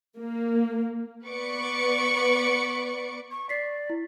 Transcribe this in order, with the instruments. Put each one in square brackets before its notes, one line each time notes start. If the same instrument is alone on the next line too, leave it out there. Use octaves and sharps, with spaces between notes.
[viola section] A#3
[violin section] B3 B4 D5 C#6 D6 C#7
[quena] C#6
[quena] D5 [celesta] B6 C7
[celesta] E4